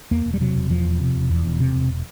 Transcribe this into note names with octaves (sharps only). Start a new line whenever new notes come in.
E2 A#3
E1
G3
C3 F#3
E1
E2 F3
E1
C3
E1
E2
E1
C3
E1